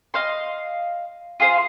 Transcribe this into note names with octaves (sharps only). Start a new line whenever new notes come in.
D#5 F5 C6
F4 G#4 C5 F5